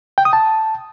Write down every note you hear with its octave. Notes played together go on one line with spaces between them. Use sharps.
G5
D#6
A5